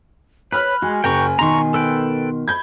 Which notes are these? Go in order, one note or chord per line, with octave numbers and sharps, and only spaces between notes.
B4 C#5 B5 F6 F#6
G#3 F#4 G#5
F#1 G5 A#5 C#6
B2 D#3 A#5 C6 C#6
A4 B4 G5
B5 G6 G#6